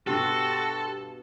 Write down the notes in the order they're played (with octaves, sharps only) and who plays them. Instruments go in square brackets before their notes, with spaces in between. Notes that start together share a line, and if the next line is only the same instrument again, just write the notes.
[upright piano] G2 B2 [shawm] F#4 [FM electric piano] G4 C6 [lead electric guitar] A4